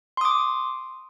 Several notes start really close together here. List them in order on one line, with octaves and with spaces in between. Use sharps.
C6 D#6 D6